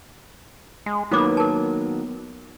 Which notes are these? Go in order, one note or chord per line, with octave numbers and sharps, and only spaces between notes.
G#3
D#3 F#3 A#3 B3 E4 D6
A#4 A5